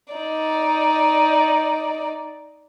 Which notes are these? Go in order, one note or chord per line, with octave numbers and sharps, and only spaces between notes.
D#4 D5